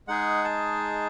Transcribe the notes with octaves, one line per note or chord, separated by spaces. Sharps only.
G#3 D#4 G#4 F#5
A5